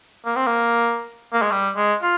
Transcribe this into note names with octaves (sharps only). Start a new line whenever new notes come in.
A#3
C4
A#3
A#3
G#3
G3
G#3
F4